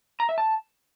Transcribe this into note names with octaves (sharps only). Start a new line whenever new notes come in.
A#5
E5
A5